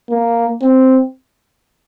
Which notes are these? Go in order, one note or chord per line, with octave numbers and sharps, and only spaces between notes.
A#3
C4